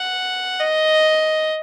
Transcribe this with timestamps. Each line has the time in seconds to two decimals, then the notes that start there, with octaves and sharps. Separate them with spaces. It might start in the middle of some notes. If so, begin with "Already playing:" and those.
Already playing: F#5
0.60 D#5